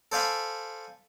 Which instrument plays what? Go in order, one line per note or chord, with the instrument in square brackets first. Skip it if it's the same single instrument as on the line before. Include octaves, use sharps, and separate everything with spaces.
[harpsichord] A4 C5 D5 F5 G#5 B5